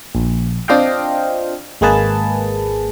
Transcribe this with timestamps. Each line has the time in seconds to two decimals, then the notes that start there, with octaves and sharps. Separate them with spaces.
0.15 A#1
0.68 C4 D4 F4 D#5 F5 G5
1.81 G#1 G#3 A#3 G#4 B4 A5